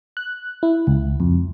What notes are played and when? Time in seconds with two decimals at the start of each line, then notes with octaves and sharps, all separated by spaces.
0.17 F#6
0.63 E4
0.87 C#2
1.20 F2